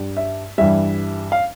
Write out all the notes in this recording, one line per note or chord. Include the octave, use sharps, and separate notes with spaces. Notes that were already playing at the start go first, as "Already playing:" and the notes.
Already playing: G2 G3
E5
G2 E3 G3 E5
F5